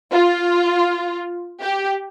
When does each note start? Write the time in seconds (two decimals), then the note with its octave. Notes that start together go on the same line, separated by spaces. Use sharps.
0.12 F4
1.61 G4